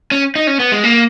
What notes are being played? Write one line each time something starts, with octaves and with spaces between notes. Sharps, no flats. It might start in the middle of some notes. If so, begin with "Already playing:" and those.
C#4
D#4
C#4
B3
G#3
A#3